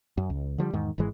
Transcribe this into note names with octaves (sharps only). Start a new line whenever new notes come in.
F#2
C#2
D3 F3 G3
E2 G#2 D#3
G#1 G#2 E3 G#3